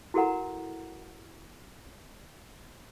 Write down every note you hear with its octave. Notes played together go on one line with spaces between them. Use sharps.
E4 F#4 A4 A#4 F#5 A#5